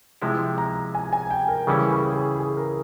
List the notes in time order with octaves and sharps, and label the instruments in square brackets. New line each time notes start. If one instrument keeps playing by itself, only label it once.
[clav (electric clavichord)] C3 F3 G#3 E4
[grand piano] A#5
G#5
G#5
G5
A#4
[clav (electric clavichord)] C#3 E3 G3 C#4 E4 [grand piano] G#4
[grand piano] G#4
G#4
G#4
A#4